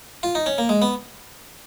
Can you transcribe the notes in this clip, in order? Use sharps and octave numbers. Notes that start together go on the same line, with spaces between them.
F4
D#4
C#4
A#3
G#3
B3